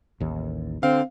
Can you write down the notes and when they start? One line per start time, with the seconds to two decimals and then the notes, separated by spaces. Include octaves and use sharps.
0.20 A1 D#2
0.83 D3 C4 F5